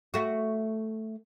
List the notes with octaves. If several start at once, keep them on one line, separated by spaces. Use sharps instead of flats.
A3 F#4